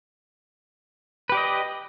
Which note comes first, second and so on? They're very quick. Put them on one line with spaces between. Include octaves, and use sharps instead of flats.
B4 G4 D5 D#5